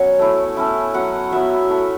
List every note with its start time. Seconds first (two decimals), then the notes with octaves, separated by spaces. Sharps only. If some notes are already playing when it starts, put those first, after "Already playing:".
Already playing: F#3 B3 C#4 C#5 F#5
0.19 A3 E4
0.57 A3 C#4 E4
0.94 F#3 C#4 E4 F#5
1.32 F#3 B3 E4 E5
1.70 A3 E4